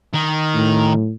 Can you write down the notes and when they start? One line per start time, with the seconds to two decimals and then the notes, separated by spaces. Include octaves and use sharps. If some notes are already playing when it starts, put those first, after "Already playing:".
0.14 D#3
0.55 A2